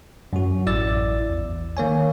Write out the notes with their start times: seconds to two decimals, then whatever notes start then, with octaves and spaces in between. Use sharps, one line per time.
0.33 F#2 F#3 F#4
0.66 A1 E4 D5 E6 A6
1.30 E2
1.77 D#3 A#3 C#5 G#5